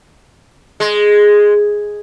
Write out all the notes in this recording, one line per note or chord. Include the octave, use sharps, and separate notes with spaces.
G#3